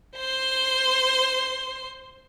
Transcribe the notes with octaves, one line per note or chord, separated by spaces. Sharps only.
C5 C6